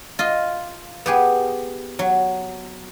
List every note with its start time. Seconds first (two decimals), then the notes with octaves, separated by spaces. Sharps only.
0.19 F4 D#5
1.06 B3 G4 G#4
1.99 F#3